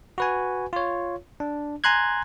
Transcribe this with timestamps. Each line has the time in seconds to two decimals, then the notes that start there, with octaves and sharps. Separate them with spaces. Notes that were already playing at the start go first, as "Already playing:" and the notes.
0.18 F#4 B4 G#5
0.73 F4 C#5
1.40 D4
1.84 G#5 A#5 C6 F#6 G#6